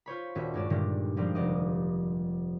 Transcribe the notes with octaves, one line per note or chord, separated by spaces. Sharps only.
F4 C5 C#5 B5
D#1 C#4 F#4 E5
G2 G#3 C#4 D5 E7
G2 A#2 D3 D#3 G3 G#3
D3 F3 G3 G#3 A#3 C4
F1 D5 D#5